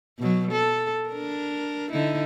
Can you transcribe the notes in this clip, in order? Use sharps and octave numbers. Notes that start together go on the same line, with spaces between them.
B2 F#3
A4
D4 A#4
D3 D#4 E4